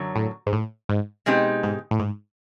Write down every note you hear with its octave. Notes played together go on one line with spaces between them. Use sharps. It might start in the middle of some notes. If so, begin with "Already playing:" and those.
Already playing: F#2 D3 F#3
A2
G#2
A2
G#2
B2 G#3 C4 D#4 G4
G#2
A2
G#2